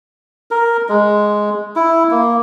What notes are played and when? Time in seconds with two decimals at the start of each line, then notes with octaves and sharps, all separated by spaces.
0.51 A#4
0.89 G#3
1.76 E4
2.11 A#3